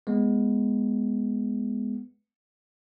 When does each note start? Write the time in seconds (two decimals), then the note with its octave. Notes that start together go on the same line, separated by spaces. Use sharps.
0.07 G#3 B3